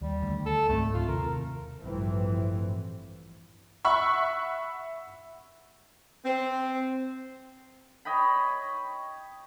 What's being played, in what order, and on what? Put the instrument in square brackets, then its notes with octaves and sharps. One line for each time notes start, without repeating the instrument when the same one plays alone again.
[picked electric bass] D#2 [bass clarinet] G3
[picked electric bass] D2
[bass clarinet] A4
[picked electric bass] C#2 G#2 C4 [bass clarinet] A3
[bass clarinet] F4
[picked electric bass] D#2 C3 [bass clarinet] A#4
[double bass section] A1 D2 G2 E3 F3 C4
[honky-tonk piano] E5 F#5 B5 C#6
[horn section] C4
[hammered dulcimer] C#5 D#5 G5 B5